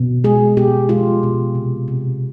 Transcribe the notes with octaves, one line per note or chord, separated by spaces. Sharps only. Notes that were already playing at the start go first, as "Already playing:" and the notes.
Already playing: B2
G#3 G#4
B2 G4
G#3 F4
B2
C3
C3